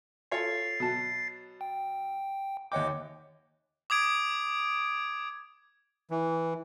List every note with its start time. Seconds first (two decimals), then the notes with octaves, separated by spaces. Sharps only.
0.32 F4 A4 C#5 A6 C7
0.80 B2 F#3 A5
1.61 G5
2.72 D#2 C#5 D#5 F#5 G5 D6
3.90 D6 D#6 G#6 D7
6.10 E3